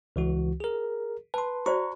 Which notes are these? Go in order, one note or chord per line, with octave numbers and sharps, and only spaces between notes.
C#2 E3 F#4
G#4 A#4
B4 A5 C6
F#4 C5 D5 A#5 C#6